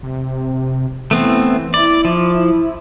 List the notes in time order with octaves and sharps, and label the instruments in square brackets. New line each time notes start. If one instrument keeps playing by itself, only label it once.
[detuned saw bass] C3
[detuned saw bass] E3 [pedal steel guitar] A3 B3 C4
[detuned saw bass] E4 [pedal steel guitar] D5
[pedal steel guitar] F3